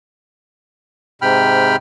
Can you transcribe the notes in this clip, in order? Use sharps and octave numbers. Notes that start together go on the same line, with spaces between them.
G#2 C3 G5 B5 F6